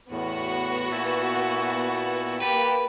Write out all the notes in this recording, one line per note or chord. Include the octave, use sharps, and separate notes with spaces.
E2 A2 B3 F#4
A#2 E4 A5
A#3 G4 B4 F#5 G5 A5